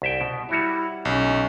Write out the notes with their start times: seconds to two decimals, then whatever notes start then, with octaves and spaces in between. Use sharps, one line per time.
0.02 C2 E5 G5
0.21 B2
0.49 G3 E4 F#4 C#5
1.05 B1 C#4